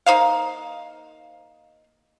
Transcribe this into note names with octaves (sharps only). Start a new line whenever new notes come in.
A#3 D#4 C5 F5